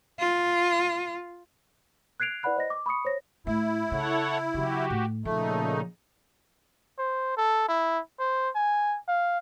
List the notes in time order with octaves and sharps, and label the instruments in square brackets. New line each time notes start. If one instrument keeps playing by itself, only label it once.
[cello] F4
[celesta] F#6 G#6 C7 D7 F7
E4 B4 D5 F#5 B5 F#6
C5 D#5 A#6
D6
B5 C#6 D#6 C#7
C5 C#5 A#6
[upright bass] A2 [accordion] E4
[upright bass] C#3 [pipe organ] A4 C#5 F#5
[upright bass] C#3 F#3 [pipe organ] F#4 G4
[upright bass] A2
[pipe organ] A#2 C#3 D#4 [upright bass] F3 [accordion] A3
[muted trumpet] C5
A4
E4
C5
G#5
F5